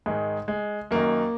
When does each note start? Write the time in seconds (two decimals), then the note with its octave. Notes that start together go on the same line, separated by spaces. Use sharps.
0.06 G#2 D#3 G#3
0.48 G#3
0.91 F#2 D#3 A#3